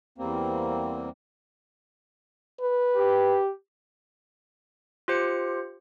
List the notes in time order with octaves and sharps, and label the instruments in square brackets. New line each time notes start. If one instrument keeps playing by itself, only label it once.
[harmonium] E2 G3 A#3 C4
[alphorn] B4
[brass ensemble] G4
[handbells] F4 G4 C5 C#7